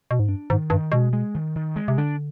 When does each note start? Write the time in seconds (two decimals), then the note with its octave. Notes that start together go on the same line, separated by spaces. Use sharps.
0.11 B2
0.19 G#2
0.29 G2 D4
0.50 G#2 D#3
0.70 G2 D#3
0.92 B2 G#3
1.13 G#3
1.35 D#3
1.55 D#3
1.76 G#3
1.88 C3
1.98 D3 D4